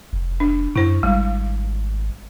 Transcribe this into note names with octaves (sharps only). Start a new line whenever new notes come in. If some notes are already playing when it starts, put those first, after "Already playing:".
F1
D4
F#2 E4 C5
G#1 G3 G#3